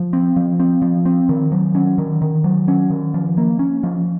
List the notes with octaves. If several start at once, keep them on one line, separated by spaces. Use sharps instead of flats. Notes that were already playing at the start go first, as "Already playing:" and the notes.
Already playing: F3
C4
F3
C4
F3
C4
D#3
F#3
C#4
D#3
D#3
F#3
C#4
D#3
F3
A#3
C#4
F3